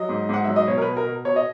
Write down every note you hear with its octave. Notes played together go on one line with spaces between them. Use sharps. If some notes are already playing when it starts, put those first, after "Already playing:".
Already playing: F#3 D#5
G#2
G#2 F#5
F#3 E5
D#5
B2 C#5
A#4
B4
B2
A#4
B2
B2 C#5
D#5